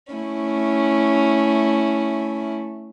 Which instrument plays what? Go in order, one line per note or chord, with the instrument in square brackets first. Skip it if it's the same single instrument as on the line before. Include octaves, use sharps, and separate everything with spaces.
[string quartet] A3 C#4 E4